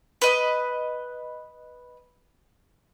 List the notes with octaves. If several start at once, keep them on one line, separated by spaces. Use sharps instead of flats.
B4 D#5